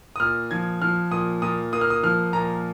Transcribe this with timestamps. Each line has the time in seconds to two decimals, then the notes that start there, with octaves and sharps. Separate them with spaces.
0.16 D#6
0.20 A#2 F6
0.51 F3 G#6
0.82 F3 F6
1.11 A#2 D#6
1.42 A#2 D#6
1.72 A#3 D#6
1.81 F6
1.90 D#6
2.03 F3 F6
2.33 A#2 A#5